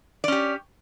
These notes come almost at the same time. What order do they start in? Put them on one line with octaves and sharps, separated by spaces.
D5 C#4 G4